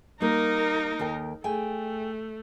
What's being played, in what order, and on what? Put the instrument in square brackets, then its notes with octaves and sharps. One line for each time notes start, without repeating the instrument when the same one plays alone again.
[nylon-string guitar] G3 A#3 [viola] D#4 A#4
[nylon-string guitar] D#2 A4 G5
[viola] A3 [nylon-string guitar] G#4 G5 G#5